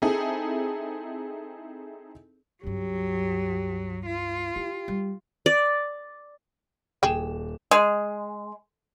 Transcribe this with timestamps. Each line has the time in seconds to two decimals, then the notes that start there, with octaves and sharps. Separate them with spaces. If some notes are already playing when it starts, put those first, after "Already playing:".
0.02 C4 D#4 E4 G#4 A4
2.63 C#2 G2 F#3 G4
4.06 F4
4.56 E4 G4
4.88 G3
5.46 D5
7.03 D#1 G#4 G5 E7
7.71 G#3